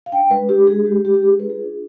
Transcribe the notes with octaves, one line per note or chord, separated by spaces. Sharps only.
F5
D4 G5
G#3 B4
D4 G4
G#3 G#4
G#3 G4
G#3 G4
G4
D4 G#4
F4 B4
G#4
D4